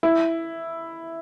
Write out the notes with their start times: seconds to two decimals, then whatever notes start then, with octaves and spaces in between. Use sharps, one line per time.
0.03 E4